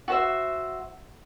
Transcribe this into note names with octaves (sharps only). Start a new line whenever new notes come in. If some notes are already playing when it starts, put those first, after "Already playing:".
F#4 C5 E5